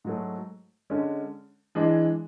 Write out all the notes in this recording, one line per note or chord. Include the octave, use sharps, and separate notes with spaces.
G#2 F#3 A3
D3 G#3 C#4
E3 G#3 D4 G#4